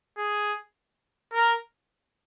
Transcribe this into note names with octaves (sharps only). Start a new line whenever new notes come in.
G#4
A#4